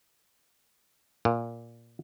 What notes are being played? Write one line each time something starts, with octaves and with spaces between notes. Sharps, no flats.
A#2